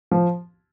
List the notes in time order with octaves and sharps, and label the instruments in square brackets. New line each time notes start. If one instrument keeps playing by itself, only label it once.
[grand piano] F3